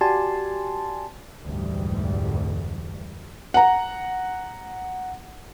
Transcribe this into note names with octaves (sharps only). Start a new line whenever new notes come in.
F#4 G4 D5 G#5 A5 C6
F1 D2 G#2 E3 G3
F#5 A#5